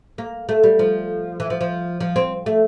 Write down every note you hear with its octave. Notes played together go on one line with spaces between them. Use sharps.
A#3
A3
G3
F3
E3
F3
F3
F3
C4
A3